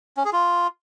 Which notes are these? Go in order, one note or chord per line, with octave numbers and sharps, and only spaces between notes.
C#4
G#4
F4